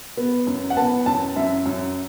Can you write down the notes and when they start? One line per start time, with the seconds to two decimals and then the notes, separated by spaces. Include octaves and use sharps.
0.17 B3
0.47 F#2
0.70 F#5
0.77 B3 A5
1.06 F#2 A5
1.36 F#2 E5
1.66 F#2